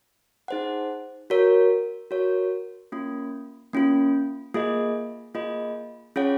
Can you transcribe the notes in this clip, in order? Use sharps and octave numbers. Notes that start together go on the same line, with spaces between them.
D#4 G#4 C5 F#5
F#4 A#4 C#5
F#4 A#4 C#5
A#3 C#4 F4
A#3 C#4 F4
A#3 F4 G#4 D#5
A#3 F4 G#4 D#5
C#4 F4 G#4 C#5 F#5